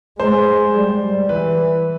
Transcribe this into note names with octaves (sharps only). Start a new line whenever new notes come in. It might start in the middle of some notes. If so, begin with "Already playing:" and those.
G#3 C5
G3
E3 B4